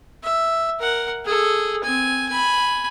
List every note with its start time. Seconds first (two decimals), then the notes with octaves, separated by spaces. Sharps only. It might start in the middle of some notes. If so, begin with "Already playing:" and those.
0.24 E5
0.80 A#4 F#5
1.26 G#4 A4
1.84 C4 G#5
2.29 G#5 B5